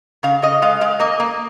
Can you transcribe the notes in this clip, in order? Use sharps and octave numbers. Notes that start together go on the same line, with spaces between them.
C#3 F5
C#3 D#5
G#3 F5
G#3 F5
A#3 D#5
A#3